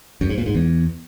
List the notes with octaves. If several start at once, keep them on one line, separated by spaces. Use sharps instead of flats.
F#2
G#2
A#2
G#2
E2